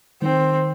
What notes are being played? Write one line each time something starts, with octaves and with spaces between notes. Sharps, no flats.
D#3 C4